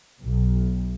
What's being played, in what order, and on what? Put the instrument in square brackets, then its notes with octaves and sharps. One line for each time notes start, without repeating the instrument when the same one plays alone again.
[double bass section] B1